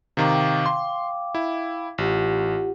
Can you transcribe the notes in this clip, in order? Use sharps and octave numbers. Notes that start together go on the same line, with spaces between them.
C3 D#3 F5 G5 A#5 D6
C6
E4
A1 F4 G4 F#5